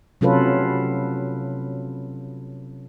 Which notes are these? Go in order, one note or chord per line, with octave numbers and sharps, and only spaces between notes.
C3 F#3 C#4 F4 A4 B4